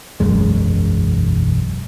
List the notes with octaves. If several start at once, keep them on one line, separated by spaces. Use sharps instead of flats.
E1 B1 F#2 G#3